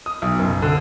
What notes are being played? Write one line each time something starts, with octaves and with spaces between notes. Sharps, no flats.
D#6
B1
F#1
D3